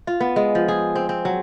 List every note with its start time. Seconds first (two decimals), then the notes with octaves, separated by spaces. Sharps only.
0.07 F4
0.20 B3
0.36 G#3
0.55 F3
0.68 G#4
0.96 C4
1.09 C4
1.25 F#3